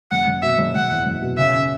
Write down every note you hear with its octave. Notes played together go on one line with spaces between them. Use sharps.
F#1 F#5
F#1
B2 E5
F#1
F#1 F#5
E2
F#1
B2
C#3 E5
C#4